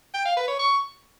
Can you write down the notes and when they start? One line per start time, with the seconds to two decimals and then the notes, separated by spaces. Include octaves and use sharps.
0.14 G5
0.25 F5
0.36 B4
0.48 C#5
0.59 C#6